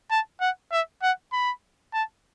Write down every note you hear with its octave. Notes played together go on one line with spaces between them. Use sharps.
A5
F#5
E5
F#5
B5
A5